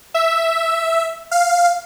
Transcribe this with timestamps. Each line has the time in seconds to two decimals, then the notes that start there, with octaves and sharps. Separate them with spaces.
0.14 E5
1.31 F5